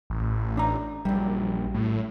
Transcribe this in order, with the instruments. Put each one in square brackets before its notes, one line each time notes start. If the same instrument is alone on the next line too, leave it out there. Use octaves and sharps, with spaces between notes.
[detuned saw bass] A1
[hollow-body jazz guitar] D4 A#5
[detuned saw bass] A#1 [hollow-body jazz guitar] F#2 G3
[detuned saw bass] A2